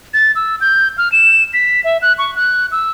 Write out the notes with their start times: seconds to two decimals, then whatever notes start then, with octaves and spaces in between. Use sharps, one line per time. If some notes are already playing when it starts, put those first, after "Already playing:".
0.14 A6
0.35 E6
0.61 G6
0.98 F6
1.12 E7
1.53 B6
1.84 E5
2.02 F#6
2.18 C#6
2.36 F#6
2.72 E6